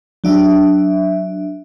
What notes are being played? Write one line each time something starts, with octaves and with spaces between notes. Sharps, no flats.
F#3 D4 E5